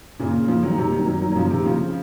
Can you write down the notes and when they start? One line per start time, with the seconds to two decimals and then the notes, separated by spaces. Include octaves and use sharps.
0.19 A#2 C#3
0.48 C#3 F3
0.63 D#3 F#3
0.77 C3 D#3
0.92 D#3 F#3
1.07 D#3 F#3
1.21 D#3 F#3
1.31 F#3
1.36 C#3 F3
1.50 C3 D#3
1.65 C#3 F3